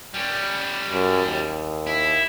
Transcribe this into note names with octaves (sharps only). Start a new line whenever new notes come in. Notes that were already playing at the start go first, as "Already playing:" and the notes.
G3 C#4
F#2
D#2
E4